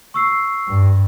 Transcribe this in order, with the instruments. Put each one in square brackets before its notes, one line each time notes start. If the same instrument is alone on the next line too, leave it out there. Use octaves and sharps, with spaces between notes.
[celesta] C#6 E6 C7
[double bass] G2